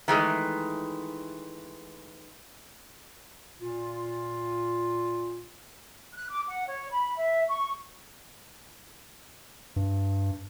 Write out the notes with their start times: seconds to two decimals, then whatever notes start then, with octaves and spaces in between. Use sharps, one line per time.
0.08 D#3 E3 G#3 A3
3.61 A#2 F4
6.14 F#6
6.30 D6
6.48 F#5
6.67 C#5
6.90 B5
7.18 E5
7.48 C#6
9.76 G2